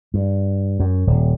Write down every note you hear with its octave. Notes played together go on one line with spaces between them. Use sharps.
G2
F#2
D#1